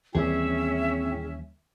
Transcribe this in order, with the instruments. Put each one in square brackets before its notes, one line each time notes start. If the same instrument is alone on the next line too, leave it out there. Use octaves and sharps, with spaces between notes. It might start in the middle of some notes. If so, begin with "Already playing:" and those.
[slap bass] D#2 E3 G3 [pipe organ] A2 C4 [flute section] C#4 E5 [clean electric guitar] G#4